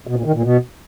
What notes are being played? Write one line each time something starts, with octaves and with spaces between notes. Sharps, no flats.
B2
A#2
D#3
A#2
B2